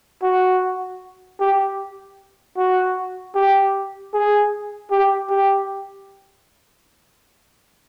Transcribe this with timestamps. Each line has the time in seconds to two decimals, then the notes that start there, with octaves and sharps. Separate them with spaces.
0.23 F#4
1.40 G4
2.57 F#4
3.35 G4
4.14 G#4
4.91 G4
5.30 G4